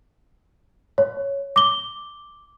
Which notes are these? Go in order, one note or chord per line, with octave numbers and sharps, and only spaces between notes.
C#5
D6 G7